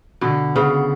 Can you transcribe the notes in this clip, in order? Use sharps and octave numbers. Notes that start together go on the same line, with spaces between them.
B2 D3
C#3 B3